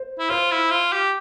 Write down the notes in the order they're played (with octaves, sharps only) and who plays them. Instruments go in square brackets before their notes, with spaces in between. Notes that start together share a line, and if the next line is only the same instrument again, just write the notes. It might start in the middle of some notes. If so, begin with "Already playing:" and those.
Already playing: [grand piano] C5
[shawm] E4
[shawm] F4 [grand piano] C5
[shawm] E4
F4
G4